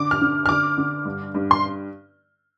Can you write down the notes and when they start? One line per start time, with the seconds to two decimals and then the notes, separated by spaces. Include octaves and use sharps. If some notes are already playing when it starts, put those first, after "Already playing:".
Already playing: D3 D6
0.11 F6
0.21 D3
0.46 F6
0.49 D3 D6
0.78 D3
1.05 G2
1.34 G2
1.51 C6